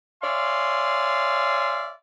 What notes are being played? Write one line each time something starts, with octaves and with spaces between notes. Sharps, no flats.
C#5 D5 E5 F5 G#5 C6